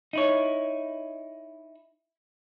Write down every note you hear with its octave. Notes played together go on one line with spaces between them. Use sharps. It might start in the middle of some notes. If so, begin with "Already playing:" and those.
D#4 E4 C#5